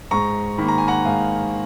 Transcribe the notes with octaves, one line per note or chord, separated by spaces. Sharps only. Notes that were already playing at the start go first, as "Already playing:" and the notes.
G#2 A#5 C#6
D#3 A#3 B5
A#5
G#5
F#5 A#5
G#2 F5 G#5